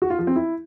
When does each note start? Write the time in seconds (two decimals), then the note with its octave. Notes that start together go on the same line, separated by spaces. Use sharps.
0.02 F#4
0.10 F4
0.19 F3
0.27 C4
0.36 E4